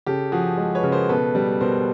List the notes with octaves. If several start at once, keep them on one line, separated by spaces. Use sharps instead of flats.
C#3 G4 A4
F3 F#4 G#4
G#3
B4 C#5
C#3
A#4 C5
B2 A4 B4
G3
B2 A#4 C5